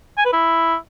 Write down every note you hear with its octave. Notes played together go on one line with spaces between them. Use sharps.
G#5
B4
E4